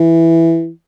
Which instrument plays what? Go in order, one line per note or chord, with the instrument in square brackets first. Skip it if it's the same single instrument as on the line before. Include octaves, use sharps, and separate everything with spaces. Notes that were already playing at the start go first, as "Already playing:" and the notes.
Already playing: [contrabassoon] E3